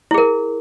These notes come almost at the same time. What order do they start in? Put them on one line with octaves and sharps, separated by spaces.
E4 G#4 A#4